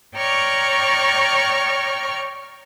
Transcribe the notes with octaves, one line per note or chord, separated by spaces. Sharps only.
C#5 D5 G5 A#5 C#6 F6